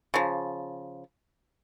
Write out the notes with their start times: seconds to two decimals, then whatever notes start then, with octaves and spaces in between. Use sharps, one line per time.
0.14 C#3 F3